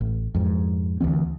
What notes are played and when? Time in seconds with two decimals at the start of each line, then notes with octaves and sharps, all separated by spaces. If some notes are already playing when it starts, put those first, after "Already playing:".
0.01 A1
0.35 F2 G#2
1.00 D2 E3 G3 C4